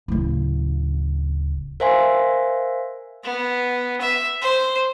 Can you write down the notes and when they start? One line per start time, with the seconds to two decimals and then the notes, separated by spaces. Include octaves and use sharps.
0.08 D1 C#3
1.80 A#4 C5 E5 F5 G#5 C6
3.24 B3
4.01 E5
4.42 C5